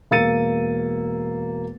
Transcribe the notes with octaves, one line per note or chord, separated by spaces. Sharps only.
E1 A#3 E6 A6 C#7 D#7